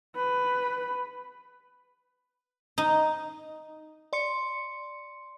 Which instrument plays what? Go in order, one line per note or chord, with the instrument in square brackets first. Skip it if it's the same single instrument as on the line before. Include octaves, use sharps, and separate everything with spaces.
[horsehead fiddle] B4
[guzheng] D#4
[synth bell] D5 C6 C#7